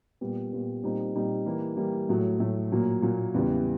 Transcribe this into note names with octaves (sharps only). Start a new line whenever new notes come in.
A#2 G3 B3
A#2 G3 B3
A#2 G3 C4 D#4
A#2 G3 C4 D#4
E3 G3 A#3
E3 G3 A#3
A2 F#3 A3
A2 F#3 A3
A#2 F#3 A#3
A#2 F#3 A#3
E2 C#3 E3 G3